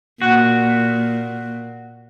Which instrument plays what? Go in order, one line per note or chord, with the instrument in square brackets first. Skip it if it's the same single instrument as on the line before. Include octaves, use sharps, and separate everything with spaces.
[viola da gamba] A#2 [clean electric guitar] F#4